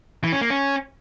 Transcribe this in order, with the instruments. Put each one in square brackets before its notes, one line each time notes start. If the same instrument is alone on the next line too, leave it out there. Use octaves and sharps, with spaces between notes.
[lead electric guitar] E3
C#4
A#3
C#4